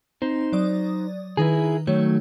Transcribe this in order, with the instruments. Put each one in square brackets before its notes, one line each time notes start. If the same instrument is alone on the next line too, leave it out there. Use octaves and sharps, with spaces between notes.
[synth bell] C4 [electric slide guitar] D#4 C5
[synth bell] F#3 D5 D#6
[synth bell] D#3 D#4 B4 [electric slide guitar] E4 G#4
[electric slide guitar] D#3 F#3 A3 [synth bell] C#5